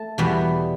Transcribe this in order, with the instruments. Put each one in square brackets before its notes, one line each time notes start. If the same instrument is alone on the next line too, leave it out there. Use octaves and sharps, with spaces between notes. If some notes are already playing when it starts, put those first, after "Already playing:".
Already playing: [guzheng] A3 A5
E2 B2 G3 B3